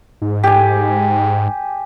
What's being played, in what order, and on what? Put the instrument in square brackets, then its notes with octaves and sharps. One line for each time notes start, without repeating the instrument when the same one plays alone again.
[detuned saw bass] G#2
[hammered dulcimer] G4 G#5